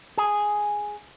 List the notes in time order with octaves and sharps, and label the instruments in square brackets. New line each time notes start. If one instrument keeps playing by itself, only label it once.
[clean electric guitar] G#4